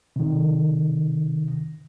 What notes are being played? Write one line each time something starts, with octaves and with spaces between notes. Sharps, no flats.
C3 D#3